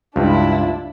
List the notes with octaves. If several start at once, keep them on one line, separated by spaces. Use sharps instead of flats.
C#2 G2 D4 E4 F4